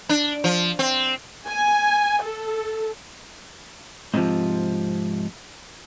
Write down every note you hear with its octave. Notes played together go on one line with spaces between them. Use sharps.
D4
F3
C4
G#5
A4
G#2 C3 D#3 F3